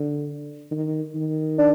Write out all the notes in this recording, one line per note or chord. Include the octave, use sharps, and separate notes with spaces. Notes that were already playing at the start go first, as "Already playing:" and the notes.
Already playing: D3
D#3
D#3
D4